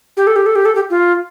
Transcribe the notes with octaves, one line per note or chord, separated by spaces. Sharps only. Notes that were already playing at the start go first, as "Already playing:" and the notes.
G4
A4
G4
A4
G4
A4
G4
F4